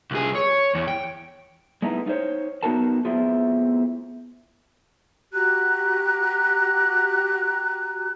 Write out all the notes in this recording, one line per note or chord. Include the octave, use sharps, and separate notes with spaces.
C2 G#4
C#5
E2
G5
G#3 A3 B3 D#4 E4
D#4 F4 G#4 C5 C#5
B3 D#4 F#4 A4 A#4 A5
A3 B3 C4 E4 F4 G#4
F#4 G4 A#5 F#6